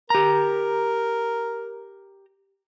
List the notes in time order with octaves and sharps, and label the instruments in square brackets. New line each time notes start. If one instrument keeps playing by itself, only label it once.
[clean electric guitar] G4 A#5 [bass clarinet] A#4